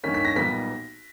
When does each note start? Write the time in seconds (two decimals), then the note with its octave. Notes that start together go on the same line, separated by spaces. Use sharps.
0.04 G2 D#3 A#3 C#4 B6
0.14 B6
0.25 A#6
0.36 B1 A#2 G3 B3 B6